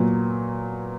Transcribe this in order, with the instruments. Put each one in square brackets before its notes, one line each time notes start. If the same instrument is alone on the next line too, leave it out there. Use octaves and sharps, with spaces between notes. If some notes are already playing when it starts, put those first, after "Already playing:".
Already playing: [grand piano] A#2 F#3 B3